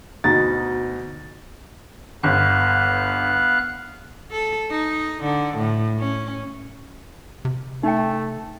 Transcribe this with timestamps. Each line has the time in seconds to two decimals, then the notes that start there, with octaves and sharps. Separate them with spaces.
0.24 D2 B2 D#4 A6
2.23 G1 B3 F5 F#6
4.32 A4
4.70 D#4
5.24 D3
5.58 A2
6.00 C#4
7.45 C3
7.83 A3 D#4 G5